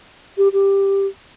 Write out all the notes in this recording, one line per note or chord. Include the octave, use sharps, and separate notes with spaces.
G4
G4